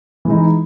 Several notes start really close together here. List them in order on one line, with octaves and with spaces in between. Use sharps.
E3 G#3 D#4